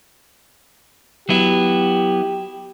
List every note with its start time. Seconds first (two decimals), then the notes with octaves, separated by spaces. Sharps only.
1.29 F#3 B3 E4 G4